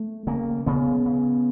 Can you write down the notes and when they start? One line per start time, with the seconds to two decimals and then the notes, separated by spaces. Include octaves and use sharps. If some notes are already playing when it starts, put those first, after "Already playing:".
Already playing: A3
0.27 C#3 A#3
0.66 C#3 B3
1.06 C#3